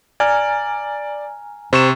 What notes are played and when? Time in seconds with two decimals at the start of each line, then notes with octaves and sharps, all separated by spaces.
0.20 D5 G#5 A#5 F6
1.73 C3 C5 C#6 E7